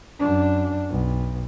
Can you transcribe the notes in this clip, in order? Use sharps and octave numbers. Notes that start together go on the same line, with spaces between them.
F#2 D4
B1